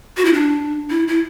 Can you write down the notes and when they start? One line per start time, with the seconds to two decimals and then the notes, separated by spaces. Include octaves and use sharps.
0.17 F#4
0.25 E4
0.33 D4
0.90 E4
1.08 E4